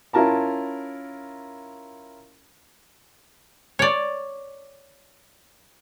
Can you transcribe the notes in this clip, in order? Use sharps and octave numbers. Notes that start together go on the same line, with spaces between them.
C#4 E4 F4 A#4 A5 A#5
C#5 D5